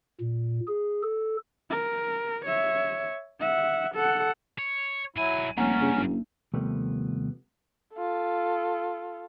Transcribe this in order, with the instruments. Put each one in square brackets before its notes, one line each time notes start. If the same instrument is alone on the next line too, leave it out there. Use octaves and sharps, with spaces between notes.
[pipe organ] A#2
G#4
A4
[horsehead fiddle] A#4
C#5 E5
E5 F#5
A4 F#5
[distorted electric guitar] C#5
[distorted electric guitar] B1 G#5 [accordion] F#3 E4
[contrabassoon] F1 [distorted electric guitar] G2 [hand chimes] A#3 F#5 A#5 [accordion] C#4
[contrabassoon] C#3 [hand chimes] A#3 D4
[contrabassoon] F#1
[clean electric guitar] D#2 C3 F3 G3 A3 B3
[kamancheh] F4 A4